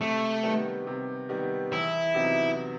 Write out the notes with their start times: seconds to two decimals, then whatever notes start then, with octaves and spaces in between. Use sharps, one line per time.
0.01 C3 A3
0.43 D#3 G3 B3
0.87 C3
1.29 D#3 G3 B3
1.72 E2 E4
2.14 C3 F#3 B3 D#4